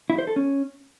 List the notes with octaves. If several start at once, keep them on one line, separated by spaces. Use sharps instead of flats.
E4
C5
A4
C#4